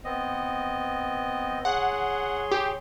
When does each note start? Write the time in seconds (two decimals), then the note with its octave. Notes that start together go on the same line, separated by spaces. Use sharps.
0.05 B3 C4 D#5
1.65 G#4 C#5 F#5 C6
2.51 G4